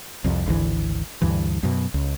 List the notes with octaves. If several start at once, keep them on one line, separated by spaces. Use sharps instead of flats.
C2 F2
G#1 D2 B2 E3
D2 G2 E3
F#2 B2
C#2